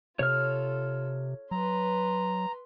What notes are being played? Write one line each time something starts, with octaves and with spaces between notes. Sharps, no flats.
C3 F4 A4 C#5 F6
F#3 B4 A#5 C6